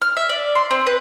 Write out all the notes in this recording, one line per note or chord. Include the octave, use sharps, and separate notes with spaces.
F6
E5
D5
C6
C4
B4